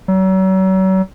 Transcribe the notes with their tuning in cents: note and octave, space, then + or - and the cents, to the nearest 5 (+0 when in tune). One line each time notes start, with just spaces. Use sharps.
F#3 +40